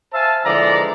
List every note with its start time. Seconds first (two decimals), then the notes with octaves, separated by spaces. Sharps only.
0.13 C5 E5 F5 G#5 A5
0.46 D3 E3 F3 G#3 D5 A#5